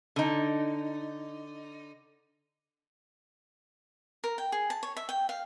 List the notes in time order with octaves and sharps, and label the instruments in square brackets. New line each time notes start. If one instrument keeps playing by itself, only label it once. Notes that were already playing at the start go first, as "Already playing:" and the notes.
[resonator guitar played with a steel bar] D3 D#4
[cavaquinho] A#4
G5
G#4
A5
C#5
E5
G5
F5